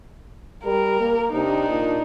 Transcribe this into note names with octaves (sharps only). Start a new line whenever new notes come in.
G3 A#4
A#3
C3 D4 D#4
A#2